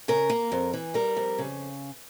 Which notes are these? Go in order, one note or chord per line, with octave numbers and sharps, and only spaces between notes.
C#3 A#4
A#3
F2
E3
G3 A#4
F2
C#3